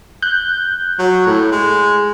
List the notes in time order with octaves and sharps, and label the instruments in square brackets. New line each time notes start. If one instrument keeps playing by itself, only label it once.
[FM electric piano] F#6 G6
[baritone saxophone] F#3
A2
G#3